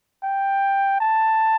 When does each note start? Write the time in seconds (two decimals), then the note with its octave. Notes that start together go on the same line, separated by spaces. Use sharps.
0.23 G5
1.00 A5